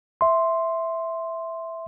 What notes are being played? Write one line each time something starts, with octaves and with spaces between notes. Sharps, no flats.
E5 C6